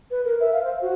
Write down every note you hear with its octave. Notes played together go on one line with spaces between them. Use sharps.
B4
A#4
E5
F5
C5
F#4